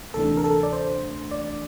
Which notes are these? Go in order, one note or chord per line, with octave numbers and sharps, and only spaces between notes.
D2 C3 E3 A3 D4 A4
A#4
A4
D5
C5
D5